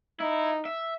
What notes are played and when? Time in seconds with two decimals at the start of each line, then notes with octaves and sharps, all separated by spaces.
0.20 D#4 E4
0.65 E5